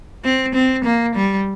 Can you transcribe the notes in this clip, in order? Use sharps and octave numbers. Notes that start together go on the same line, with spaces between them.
C4
C4
A#3
G3